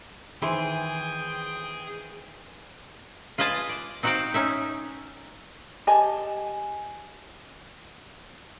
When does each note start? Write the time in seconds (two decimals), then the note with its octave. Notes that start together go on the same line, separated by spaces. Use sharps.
0.42 D#3 E3 G#4 C5 G5 C6
3.38 F4 B4 D#5 G#5 A5
3.69 D5
4.03 C4 D#4 F#4 C5 F5 G5
4.34 C#4 D#4 E5
5.87 G4 D#5 G#5 A5